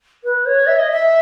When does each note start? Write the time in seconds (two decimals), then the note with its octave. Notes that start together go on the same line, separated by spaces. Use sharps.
0.24 B4
0.46 C#5
0.67 E5
0.79 D#5
0.91 E5